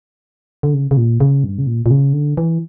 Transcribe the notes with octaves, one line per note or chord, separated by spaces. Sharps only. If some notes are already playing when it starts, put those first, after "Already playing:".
D3
C#3
C#3
A#2
C#3
G2
C#3
A#2
A#2
C#3
D3
E3